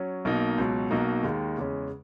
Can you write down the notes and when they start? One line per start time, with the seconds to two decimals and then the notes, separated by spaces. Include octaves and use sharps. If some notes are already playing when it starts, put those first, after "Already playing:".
Already playing: F#3 C#4
0.25 B1 B2 A#3 D#4
0.58 C#2 B2 F#3
0.90 B1 B2 A#3 D#4 F#4
1.23 D#2 D#3 G#3
1.57 E2 C#3 G#3 C#4